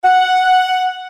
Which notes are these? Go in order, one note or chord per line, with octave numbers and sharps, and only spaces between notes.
F#5